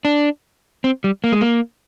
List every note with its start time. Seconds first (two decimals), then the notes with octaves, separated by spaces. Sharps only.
0.05 D4
0.84 C4
1.04 G3
1.24 A#3
1.32 G#3
1.41 A#3